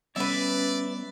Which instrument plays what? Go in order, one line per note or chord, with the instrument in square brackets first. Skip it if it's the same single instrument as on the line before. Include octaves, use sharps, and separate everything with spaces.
[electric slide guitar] G3 B3 C#5 [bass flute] C#4 [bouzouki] B4 E5 [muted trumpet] D5